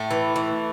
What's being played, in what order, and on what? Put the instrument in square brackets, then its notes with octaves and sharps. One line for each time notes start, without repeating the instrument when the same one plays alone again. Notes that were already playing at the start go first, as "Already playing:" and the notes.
Already playing: [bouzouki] A2 A3
E3
E3